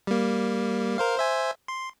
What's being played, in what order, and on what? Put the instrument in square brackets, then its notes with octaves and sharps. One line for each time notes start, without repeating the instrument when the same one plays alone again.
[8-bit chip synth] G3 A#3
A#4 C5 F5
C5 E5 G#5
C6